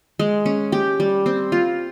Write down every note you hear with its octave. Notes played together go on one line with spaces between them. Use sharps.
G#3
C#4
G4
G3
C4
F4